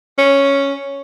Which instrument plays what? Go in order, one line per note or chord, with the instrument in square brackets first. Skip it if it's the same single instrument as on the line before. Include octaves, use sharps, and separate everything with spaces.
[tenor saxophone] C#4